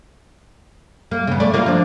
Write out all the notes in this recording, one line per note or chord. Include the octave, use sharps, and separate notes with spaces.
A#3
C#3 B3
A3 D5
A#3 F4 F5
F3 D4